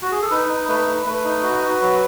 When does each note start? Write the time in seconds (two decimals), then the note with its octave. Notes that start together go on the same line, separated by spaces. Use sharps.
0.02 F#4
0.12 G#4
0.22 A4
0.31 D#4 B4
0.49 D#4
0.68 A3 B4
0.87 A3
1.06 A3 B4
1.24 D#4
1.43 F#4
1.62 F#4
1.81 F#3